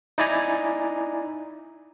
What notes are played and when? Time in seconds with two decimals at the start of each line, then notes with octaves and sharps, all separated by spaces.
0.18 D#4 E4 D5 G#5 A#5